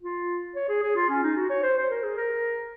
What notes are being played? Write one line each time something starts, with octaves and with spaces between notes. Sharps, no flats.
F4
C#5
G#4
G#4
F4
C#4
D#4
F#4
C#5
C5
C5
A#4
G#4
A#4